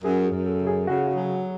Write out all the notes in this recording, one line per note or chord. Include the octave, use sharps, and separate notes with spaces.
F#2 G#4
G#4
F#2
A4
C#3
G#4
C#3 F#4
F#4
F#3